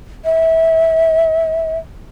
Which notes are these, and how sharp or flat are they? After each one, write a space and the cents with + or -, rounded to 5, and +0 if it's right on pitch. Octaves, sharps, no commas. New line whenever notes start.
E5 -20